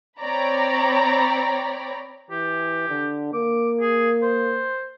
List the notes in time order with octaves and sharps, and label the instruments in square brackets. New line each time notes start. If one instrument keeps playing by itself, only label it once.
[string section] C4 C#5 D5 G5 A#5 B5
[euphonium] E3 [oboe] G4
[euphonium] D3
[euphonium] A#3 [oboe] D6
[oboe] G#4
C5